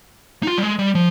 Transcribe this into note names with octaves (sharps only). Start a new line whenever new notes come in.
D#4
F4
G3
G#3
G3
F3